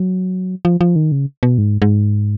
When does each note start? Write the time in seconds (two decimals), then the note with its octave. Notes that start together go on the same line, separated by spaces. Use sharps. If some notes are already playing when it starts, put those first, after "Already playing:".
Already playing: F#3
0.65 F3
0.81 F3
0.96 D#3
1.12 C#3
1.43 B2
1.58 G#2
1.82 G#2